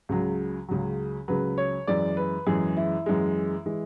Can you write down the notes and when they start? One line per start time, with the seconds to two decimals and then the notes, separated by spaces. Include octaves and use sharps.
0.09 C#2 C#3 F#3
0.68 C#2 C#3 F#3
1.28 C#2 C#3 F#3 B4
1.58 C#5
1.87 F#2 E3 G#3 D5
2.17 B4
2.46 F#2 E3 G#3 G#4
2.77 E4
3.06 F#2 E3 G#3
3.66 E3 G#3